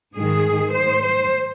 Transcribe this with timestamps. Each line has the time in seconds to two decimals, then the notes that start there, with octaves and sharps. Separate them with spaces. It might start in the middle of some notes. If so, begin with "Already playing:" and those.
0.15 G#2 D#3 G#4
0.74 C5
1.04 C5